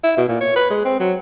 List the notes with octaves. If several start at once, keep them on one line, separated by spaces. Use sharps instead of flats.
E4
B2
A#2
C#5
B4
G#3
C4
F#3